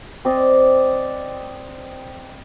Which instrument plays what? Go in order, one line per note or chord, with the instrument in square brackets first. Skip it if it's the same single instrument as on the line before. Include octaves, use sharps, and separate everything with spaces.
[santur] C4 D5 D#5